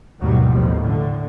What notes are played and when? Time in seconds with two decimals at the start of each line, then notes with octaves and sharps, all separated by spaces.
0.21 D#2 G#2 B2 D#3 F#3 G3
0.50 A1 D#2 B2 F3
0.82 A2 D3